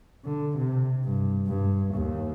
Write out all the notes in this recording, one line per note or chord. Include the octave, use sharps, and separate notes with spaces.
D3
C3
G2
G2
D#2